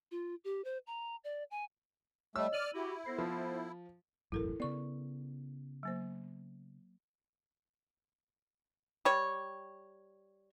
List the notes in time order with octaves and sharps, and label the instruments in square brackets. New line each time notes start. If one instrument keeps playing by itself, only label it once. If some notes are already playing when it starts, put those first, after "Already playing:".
[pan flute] F4
G4
C5
A#5
D5
G#5
[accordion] G3 A3 [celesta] C#5 D#5 [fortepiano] E6
[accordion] D5 F6 [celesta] D#7 F#7
[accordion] E4 [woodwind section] F#4 G4
[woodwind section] B3 A4 C5 [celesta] A#6 C7
[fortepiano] F3
[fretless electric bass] E1 A1 F#2 [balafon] E4 A4 A#4
[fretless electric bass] C#3 B3 [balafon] D5 C#6
[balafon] F#3 A#3 C5
[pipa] G3 C#5